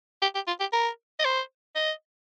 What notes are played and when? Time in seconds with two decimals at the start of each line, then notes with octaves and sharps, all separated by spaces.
0.22 G4
0.35 G4
0.47 F4
0.60 G4
0.73 A#4
1.19 D#5
1.25 C5
1.75 D#5